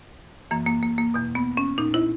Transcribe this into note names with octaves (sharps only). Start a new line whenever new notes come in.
F#2 E3 A#3
A#3
A#3
A#3
E2 B2
B3
C#4
A#2 D#4
E4